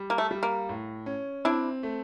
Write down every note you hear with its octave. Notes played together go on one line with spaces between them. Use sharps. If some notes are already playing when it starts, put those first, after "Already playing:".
Already playing: G3
A#3
A3
G3
A#3
A2
C#4
C4 D4 E4
A3